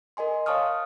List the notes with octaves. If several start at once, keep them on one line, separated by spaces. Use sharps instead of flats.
A#4 D#5 G#5 C6
C#5 F5 A5 C#6 D#6 F6